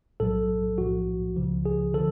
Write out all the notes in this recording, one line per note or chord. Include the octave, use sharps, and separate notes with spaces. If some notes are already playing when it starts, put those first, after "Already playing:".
B1 A2 F#3 A4
B1 A2 F3 F#4
C#2 C#3 F3
G#4
D3 F3 A4